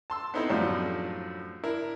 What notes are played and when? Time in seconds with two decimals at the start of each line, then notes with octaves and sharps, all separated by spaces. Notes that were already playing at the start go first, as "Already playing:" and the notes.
0.10 A5 C6 E6
0.34 B3 C4 D#4 E4 A4 C5
0.49 F#2 A2 F3 G3 D4
1.64 D4 E4 A#4